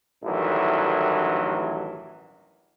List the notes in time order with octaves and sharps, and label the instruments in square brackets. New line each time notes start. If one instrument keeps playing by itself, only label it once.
[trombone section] A1 D2 G2 D#3 E3 F#3